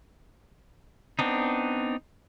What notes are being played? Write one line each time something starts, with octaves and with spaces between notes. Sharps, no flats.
B3 C4 D4 D#4